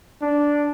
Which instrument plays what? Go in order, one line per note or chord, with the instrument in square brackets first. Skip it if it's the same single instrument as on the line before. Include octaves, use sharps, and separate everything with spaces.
[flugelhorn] D4